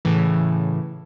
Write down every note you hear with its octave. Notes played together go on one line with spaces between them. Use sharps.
A2 C#3 E3